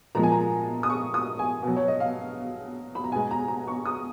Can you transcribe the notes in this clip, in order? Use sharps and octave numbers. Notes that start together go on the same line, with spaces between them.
A#2 F3 G#3 A#5
G#5
A#5
D#6
C#6
D#6
G#5
B2 F#3
C#5
D#5
F5
B5
A#5
B2 G#3 G#5
A#5
A#5
C#6
D#6